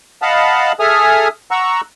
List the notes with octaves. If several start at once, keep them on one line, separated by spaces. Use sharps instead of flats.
D#5 F5 F#5 A5 B5
G#4 A4 E5 G#5 D#6 F6
F#5 A#5 C#6 E6